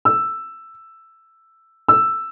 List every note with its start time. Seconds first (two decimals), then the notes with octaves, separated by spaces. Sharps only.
0.05 E6
1.88 E6